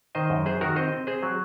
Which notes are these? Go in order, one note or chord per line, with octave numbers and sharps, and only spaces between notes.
D#3 C5 D#5
F#2
F#3 G#4 C5
D#3 F#4 A#4
C4 C5 D#5
C4
C4 G#4 C5
F#3